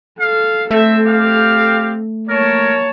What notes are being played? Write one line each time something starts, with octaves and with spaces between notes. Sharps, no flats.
A4 F5
A3 C4 A4 E5
G4 F5
A#3 A#4 C#5 A5